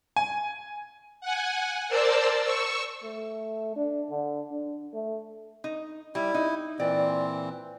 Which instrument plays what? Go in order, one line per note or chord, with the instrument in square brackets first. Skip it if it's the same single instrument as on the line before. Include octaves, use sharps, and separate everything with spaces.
[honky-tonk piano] G#5
[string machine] F#5 G#5
A#4 C5 D5 A5 E6
C#6 E6
[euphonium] A3
D4
D3
D4
A3
[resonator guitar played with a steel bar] D#4
[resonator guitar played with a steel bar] G3 [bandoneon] E4
[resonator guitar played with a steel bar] D#4
[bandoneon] A#2 E3 C4 [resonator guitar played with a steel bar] D5